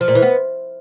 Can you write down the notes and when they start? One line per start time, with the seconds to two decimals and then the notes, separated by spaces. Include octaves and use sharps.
0.01 F3
0.08 A#2
0.15 E3
0.22 B3